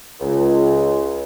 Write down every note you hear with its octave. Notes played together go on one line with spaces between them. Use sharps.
C#2